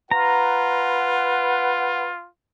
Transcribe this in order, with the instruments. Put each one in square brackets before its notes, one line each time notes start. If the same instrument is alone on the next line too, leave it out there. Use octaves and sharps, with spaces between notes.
[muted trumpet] F4 [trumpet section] B4 F#5 [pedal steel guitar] A#5